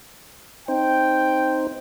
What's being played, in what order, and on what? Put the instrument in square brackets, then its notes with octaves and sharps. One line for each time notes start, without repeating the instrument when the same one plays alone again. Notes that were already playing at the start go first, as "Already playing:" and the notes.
[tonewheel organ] C4 D#4 C5 [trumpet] G5